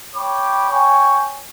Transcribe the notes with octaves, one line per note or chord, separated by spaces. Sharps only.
C#5 G5 B5 D6
C#5 G5 G#5 C#6